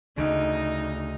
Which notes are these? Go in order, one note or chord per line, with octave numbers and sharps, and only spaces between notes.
D2 C#3 D#4